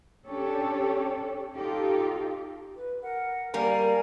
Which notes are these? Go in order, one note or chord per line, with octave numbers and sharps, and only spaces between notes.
C#4 D4 G4 A4 C#5
D#4 F4 G4 A4
B4
A#4 F#5
G3 A#3 A#4 D5 F5 G#5